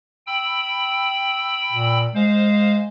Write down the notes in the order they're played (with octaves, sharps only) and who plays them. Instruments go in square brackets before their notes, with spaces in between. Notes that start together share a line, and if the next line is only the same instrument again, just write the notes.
[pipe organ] G5 B5 E6
[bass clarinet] A#2
[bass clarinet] G#3 [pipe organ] C5 F5